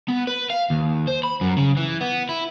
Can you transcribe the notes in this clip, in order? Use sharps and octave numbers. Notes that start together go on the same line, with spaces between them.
B3
B4
F5
D#2
C5
B5
F#2
C#3
E3
B3
E4